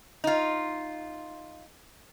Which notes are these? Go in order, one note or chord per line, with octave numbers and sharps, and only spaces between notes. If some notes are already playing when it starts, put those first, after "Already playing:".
D#4 F4